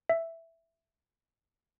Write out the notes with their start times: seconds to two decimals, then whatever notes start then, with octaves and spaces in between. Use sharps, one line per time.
0.09 E5